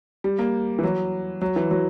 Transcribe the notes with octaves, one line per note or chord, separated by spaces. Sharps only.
G3
A#3
E3
F#3
F#3
E3
F#3